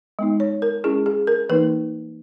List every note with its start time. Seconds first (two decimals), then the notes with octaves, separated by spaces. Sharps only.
0.19 G#3 B3 D#4
0.40 C#5
0.62 A#4
0.84 G#3 C#4 E4 G#4
1.06 G#4
1.27 A#4
1.49 E3 A#3 D#4 B4